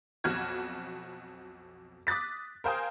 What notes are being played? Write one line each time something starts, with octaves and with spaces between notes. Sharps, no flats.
B1 F2 F#4 F6 G#6
D6 D#6 F#6 A6 B6
A#4 C5 F5 G5 G#5 D#6